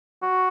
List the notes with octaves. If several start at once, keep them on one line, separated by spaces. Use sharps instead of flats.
F#4